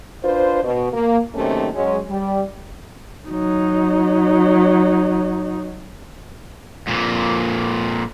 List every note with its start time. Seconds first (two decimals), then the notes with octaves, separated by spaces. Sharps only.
0.23 D4 F4 B4 C5
0.63 B2
0.93 A#3
1.35 C3 D#3 F#3 A3 A#3 C#4
1.75 F#3 G#3 C#4
2.09 G3
3.29 F#3 D#4
6.87 F2 A#2